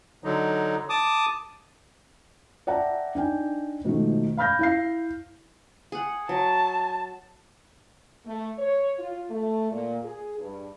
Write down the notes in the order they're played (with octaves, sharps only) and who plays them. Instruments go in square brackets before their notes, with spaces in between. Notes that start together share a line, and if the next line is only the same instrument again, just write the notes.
[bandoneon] D3 F#3 D#4
A5 D6 D#6
[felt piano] D5 E5 F#5 G5 A5 A#5
D4 D#4 G5 G#5
G#2 B2 D#3 F3 G#3 A3
F5 B5 F6 G6 A#6
E4 F5 C7
[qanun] G#4 F#5
[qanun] F#3 [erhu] A5
[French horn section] A3
C#5
F4
A3
A#2
G#4
G2